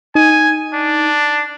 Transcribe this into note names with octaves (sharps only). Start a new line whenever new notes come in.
D#4 G#5
D4